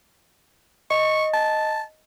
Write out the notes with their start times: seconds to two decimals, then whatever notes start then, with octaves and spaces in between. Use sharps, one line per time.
0.91 D#5 C#6
1.34 A5